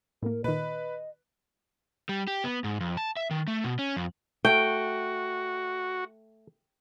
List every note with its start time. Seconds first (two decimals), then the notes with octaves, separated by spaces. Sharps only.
0.23 A2 A#3 A#4
0.44 A#2 D#3 B4 D#5
2.09 G3
2.27 G4
2.44 B3
2.64 G#2
2.80 F2
2.97 A5
3.17 E5
3.31 D#3
3.48 A3
3.64 B2
3.79 C#4
3.97 F2
4.45 A3 F#4 G5